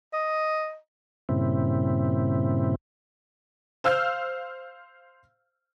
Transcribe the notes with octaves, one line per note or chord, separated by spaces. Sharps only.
D#5
G2 A#2 C#3 C4 E4
C5 F5 E6 F6 G6